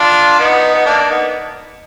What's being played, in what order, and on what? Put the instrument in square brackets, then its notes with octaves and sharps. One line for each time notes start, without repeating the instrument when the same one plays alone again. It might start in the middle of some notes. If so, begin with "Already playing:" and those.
Already playing: [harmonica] D4 F4
B3 D#4
B3
A#3 D4
B3 D#4